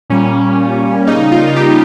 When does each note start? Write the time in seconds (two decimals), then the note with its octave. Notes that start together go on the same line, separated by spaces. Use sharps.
0.10 A#2 G3 A#3 C#4
1.07 C#3 G3 A#3 D#4
1.32 F4
1.47 F4
1.56 G4